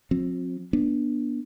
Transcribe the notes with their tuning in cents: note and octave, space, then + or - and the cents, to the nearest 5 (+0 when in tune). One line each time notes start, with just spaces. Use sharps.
F3 +45 C4 +20
B3 -35 D4 +0